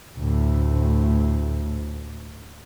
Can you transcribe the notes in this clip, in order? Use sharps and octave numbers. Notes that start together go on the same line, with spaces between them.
D2 A2